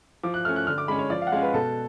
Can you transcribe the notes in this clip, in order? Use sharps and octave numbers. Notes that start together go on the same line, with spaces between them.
F3 D6
F#6
A3 C#4 F6
F#6
D3 F6
D6
G#3 C#4 B5
C#5
F3 D5
F5
F#5
G#3 C#4 F5
B4
B2 A4